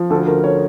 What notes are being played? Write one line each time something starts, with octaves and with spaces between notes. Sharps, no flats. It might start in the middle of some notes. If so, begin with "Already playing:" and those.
Already playing: F3
D2 A4
D2 A#4
C#5